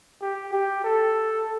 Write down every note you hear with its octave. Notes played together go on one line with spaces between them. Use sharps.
G4
G4
A4